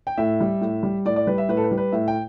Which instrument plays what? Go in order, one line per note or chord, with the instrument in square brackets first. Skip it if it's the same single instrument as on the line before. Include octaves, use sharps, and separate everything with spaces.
[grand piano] G5
A2 E5
G3
A2
G3
A2 D5
D5
G3 B4
E5
A2 B4
A4
B4
G3
B4
A2 E5
G5